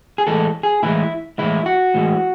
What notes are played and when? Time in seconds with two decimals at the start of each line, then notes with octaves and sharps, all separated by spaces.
0.18 G#4
0.27 A2 E3 G#3 A4
0.63 G#4
0.83 A2 E3 G#3 E4
1.38 A2 E3 G#3 E4
1.66 F#4
1.94 A2 E3 G#3